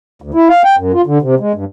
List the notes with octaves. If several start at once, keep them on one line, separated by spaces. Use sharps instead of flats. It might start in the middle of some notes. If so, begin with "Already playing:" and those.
D2
E4
F5
G5
F#2
F4
D3
C3
G#3
G2